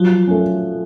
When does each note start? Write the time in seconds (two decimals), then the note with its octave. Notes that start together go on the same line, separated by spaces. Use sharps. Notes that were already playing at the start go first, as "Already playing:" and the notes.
Already playing: F3 F#3
0.28 A3 C#4